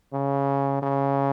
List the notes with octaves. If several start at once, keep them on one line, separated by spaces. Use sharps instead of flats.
C#3
C#3